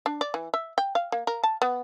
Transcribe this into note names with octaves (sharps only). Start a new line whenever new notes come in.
D4
D5
E3
E5
G5
F5
A#3
A#4
A5
B3